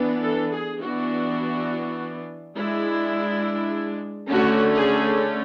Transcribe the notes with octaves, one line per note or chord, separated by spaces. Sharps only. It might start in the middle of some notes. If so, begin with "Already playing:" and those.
Already playing: E3 B3 D4
A4
G#4
E3 B3 D4 F#4
G#3 D4 E4
D3 A3 C#4 F#4
G#4